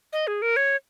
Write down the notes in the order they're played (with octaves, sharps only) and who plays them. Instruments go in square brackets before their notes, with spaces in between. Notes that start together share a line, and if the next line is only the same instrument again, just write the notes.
[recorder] D#5
G#4
A#4
C#5